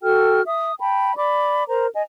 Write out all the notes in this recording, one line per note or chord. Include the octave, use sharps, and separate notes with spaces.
F#4 A4 G5 F6
E5 D#6
G5 A5 B5
D5 B5 D6
A#4 C5 A#5
D#5 G#5